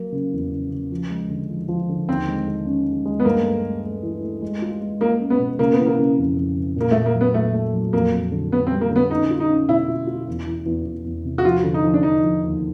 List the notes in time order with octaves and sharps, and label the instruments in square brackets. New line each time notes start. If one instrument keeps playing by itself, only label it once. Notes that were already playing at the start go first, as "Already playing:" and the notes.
Already playing: [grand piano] F#3 A#3
C#3
E2
C#3
C#3
F3
G#3
D3
F3
F3
D3
[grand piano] D#2 [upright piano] C4
[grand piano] G#3
G#3
C#4
G#3
G#3
[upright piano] B3
[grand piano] G2 [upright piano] A#3
[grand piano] A3
A3
A3
E3
A3
G#3
F4
G#3
[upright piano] A#3 [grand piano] F4
[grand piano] C#4
[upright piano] B3
[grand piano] B2
[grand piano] C#3 [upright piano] A#3
[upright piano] B3
[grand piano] E3
[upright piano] A#3
[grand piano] C#3
F2
F2
C#3
[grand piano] A#2 [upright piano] A#3
[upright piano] A3
[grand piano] A#2
[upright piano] A#3
[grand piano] F#3
[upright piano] B3
[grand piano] A#2 [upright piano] A3
[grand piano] A3
F#3
[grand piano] F2 [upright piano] A#3
[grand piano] F2
D3
[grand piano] D3 [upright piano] B3
[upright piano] C4
[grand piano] G3
[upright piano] A#3
[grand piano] D3
[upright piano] B3
[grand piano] C#4 [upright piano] D#4
[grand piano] F4
[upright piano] D#4
[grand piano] C#4
[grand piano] B2 [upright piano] E4
[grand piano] F4
F4
E2
E3
E2
E2
E2
C3
[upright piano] F#4
[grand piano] F3 [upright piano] F4
[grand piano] D3
[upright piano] D#4
[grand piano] F3
[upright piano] D4
[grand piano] F3 [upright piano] D#4
[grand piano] F3
D#2